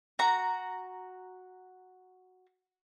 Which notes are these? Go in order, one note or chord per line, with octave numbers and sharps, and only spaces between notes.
F#4 A#5